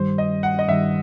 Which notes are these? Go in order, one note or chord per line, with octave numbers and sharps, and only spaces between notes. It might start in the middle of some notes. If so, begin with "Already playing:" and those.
Already playing: G2 D#3 G3 C5
D#5
F#5
D#5
G2 D#3 G3 E5